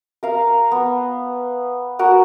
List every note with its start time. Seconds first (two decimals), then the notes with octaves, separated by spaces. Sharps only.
0.23 A#4 F5 A#5
0.72 B3
1.99 F#4 A#4 F#5